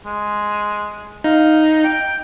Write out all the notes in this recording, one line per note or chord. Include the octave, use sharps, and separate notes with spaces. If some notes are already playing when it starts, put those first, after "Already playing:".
G#3
D#4 F5
G5